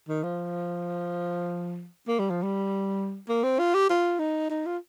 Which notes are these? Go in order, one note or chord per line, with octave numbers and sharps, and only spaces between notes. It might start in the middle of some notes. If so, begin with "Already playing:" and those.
D#3
F3
A#3
G3
F3
G3
A#3
C4
F4
G4
F4
D#4
D#4
F4